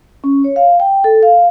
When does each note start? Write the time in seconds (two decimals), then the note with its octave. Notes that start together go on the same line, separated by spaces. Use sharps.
0.24 C#4
0.44 C#5
0.56 F5
0.80 G5
1.04 A4
1.23 F5